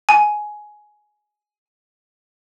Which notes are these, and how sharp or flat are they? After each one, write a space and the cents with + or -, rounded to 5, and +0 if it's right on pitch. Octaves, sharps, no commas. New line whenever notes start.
G#5 +15